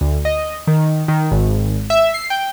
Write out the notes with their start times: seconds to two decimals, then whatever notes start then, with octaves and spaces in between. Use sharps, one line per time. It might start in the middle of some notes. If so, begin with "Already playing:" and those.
0.01 D2
0.25 D#5
0.67 D#3
1.08 D#3
1.32 G#1
1.90 E5
2.14 C7
2.30 G5